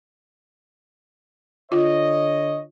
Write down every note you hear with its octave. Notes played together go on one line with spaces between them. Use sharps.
D3 F4 C#5 D#5